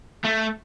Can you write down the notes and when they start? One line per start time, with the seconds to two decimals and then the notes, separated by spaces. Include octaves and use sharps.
0.24 A3